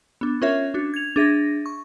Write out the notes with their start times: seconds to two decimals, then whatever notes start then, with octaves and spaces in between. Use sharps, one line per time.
0.21 B3 D4
0.42 C#4 F4 A#4 C#5 E5
0.74 D4 F#4
0.94 G#6 F7
1.16 D4 G#4 E5 A#6
1.66 C#6